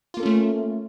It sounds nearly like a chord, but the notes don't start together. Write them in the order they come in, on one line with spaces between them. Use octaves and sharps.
F4 A#3 A4 C#4 A3